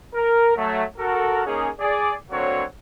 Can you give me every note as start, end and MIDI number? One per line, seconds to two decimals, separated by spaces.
0.14 0.53 70
0.57 0.83 54
0.57 0.83 57
0.98 1.43 66
0.98 1.43 69
0.98 1.43 70
1.46 1.69 49
1.46 1.69 58
1.46 1.69 61
1.46 1.69 63
1.46 1.69 68
1.80 2.13 68
1.80 2.13 74
2.31 2.63 50
2.31 2.63 54
2.31 2.63 58
2.31 2.63 60
2.31 2.63 66
2.31 2.63 73